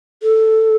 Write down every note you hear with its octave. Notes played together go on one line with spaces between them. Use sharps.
A4